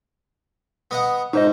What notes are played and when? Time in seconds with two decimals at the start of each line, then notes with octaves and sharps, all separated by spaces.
0.91 B3 D#5 F#5
1.33 G#2 D#4 C5 D#5